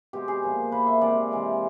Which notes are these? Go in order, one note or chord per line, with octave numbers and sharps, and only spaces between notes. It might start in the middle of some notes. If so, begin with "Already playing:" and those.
B2 G#3 C4 G4
G#4
A#2 F3 A#3
A#2 F3 A#3 B4
E5
C3 E3 G#3 C4 D5
C3 E3 G#3 C4